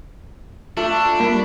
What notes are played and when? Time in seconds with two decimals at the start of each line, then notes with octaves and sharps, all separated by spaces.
0.77 A3 D4 F4
1.20 G3 A#3 B5